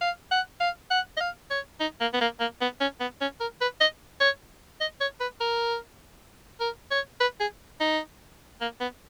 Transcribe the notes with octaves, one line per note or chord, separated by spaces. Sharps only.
F5
F#5
F5
F#5
D#5
F5
C#5
D#4
A#3
B3
A#3
A#3
B3
C#4
B3
C#4
A#4
B4
D#5
C#5
D#5
C#5
B4
A#4
A#4
C#5
B4
G#4
D#4
A#3
B3